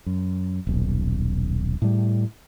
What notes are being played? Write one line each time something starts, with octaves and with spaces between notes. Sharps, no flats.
F#2
D#1 B1
A2 G3